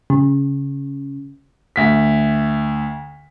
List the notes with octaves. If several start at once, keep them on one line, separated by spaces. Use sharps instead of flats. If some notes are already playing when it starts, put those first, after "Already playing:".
C#3
D2 B6